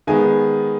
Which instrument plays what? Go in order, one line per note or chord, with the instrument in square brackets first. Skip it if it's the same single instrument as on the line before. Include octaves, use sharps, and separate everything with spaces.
[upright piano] D#3 G#3 B3 G#5